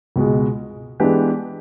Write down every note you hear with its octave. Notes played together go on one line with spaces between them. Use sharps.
C#2 B2 G#3
E3 G#3 B3 D4 G4